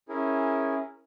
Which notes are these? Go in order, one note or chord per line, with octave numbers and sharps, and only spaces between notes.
C#4 E4 G#4 A#4